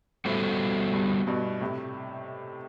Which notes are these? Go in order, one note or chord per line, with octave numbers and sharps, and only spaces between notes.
A2 G3 B3 F#4 A4 C5
G2
G2 B2
A2 C3